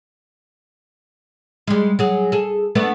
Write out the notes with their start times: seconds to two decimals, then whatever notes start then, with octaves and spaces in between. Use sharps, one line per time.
1.67 G3 G#3
1.99 F#3 G#4
2.32 G#4 A4
2.75 A3 B3 D4